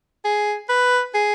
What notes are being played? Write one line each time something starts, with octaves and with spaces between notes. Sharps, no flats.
G#4
B4
G#4